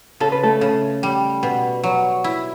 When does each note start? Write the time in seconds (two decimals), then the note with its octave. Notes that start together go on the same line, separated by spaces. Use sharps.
0.20 C#3 A4
0.32 B4
0.43 A3 A4
0.61 C#3
1.03 G3
1.43 B2
1.83 F#3
2.24 E4